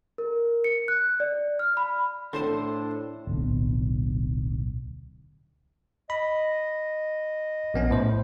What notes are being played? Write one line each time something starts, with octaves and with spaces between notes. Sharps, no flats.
A#4
C#7
F#6
D5
F6
B5
A2 D3 E3 C4 D4 A4 C5
D1 B1
D#5 B5
A#1 B3 C#4
A2 C5